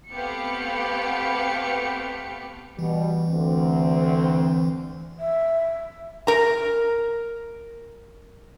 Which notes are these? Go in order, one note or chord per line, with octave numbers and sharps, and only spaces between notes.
A3 B3 C4 G4 F5 C#7
B2 E3 G3
D2 C4
E5
A#4 A#5